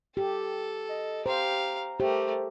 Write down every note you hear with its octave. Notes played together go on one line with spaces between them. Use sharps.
G4 A4
D#5
G4 C5 F5 A#5
A3 G4 A#4 C5